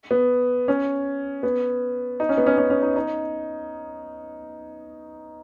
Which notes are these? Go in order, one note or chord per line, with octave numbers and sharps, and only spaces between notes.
B3
C#4
B3
D#4
C#4
B3
C#4
C#4
C#4
D#4
D#4